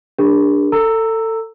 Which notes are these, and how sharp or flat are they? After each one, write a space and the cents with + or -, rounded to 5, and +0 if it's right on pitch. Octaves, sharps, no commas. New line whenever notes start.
D4 +0 G4 +45 A#4 +0
A4 +25 A#5 -20 E6 +0